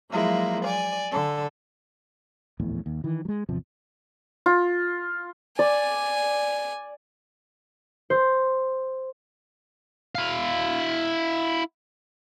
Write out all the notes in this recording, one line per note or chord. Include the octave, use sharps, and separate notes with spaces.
F3 F#3 G#3 A#3 E4
D5 G#5
D3 A4
D1 A#1 E2 A2
D#2
D#3 E3
F#3 G#3
G#1 E2 C3 F3
F4
D5 G#5
C5
E4 F5